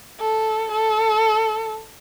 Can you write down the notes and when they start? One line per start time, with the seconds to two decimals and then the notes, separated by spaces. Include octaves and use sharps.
0.20 A4
0.72 A4